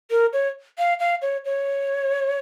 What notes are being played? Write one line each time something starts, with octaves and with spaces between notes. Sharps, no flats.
A#4
C#5
F5
F5
C#5
C#5